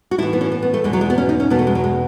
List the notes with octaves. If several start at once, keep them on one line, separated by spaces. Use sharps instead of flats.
F#4
A2 E3 E4
B3
C#4
B3
B3
A3
E2 B2 G#3
F#3
G#3
B3
C#4
D#4
C#4
E2 B2 B3
A3
G#3
F#3
G#3